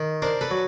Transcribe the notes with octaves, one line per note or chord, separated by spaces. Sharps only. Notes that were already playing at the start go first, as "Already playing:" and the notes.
Already playing: D#3
D4 A#4 C5
A4 B4
F#3